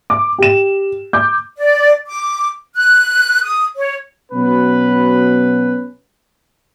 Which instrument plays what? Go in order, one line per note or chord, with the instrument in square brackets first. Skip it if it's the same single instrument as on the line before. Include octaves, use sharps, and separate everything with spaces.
[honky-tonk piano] D6
G4 E7
D6 G6
[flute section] D5
D6
F#6
D#6
C#5
[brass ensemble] B2 F#3 C#4 B4